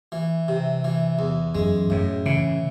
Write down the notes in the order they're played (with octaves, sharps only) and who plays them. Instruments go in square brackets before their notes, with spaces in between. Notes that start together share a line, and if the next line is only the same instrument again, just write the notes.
[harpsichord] E3
C3
E3
E2
[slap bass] F#2 [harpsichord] G#3
[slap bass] F#2 [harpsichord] A2
[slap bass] C#3 [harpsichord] E3